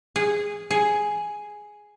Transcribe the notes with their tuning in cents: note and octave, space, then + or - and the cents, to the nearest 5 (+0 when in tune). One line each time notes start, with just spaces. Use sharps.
G#4 -10
G#4 +5